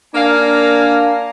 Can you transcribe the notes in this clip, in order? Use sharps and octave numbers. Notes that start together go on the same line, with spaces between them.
A#3 D4 A#4 F5 G#5